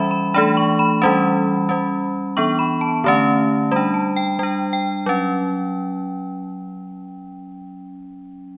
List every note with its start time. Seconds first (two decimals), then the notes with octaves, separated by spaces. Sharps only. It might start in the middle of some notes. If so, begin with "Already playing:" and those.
Already playing: E3 G3 C#4 E5 B5
0.11 B5
0.34 E3 A3 D4 B5
0.57 C#6
0.79 B5
1.02 E3 G3 C#4
1.69 G3 C#4
2.37 E3 B3 D4 C#6
2.59 B5
2.81 A5
3.04 D3 A3 C#4
3.71 G3 D4 B5
3.94 A5
4.16 G5
4.39 G3 D4 G5
4.73 G5
5.06 F#3 C#4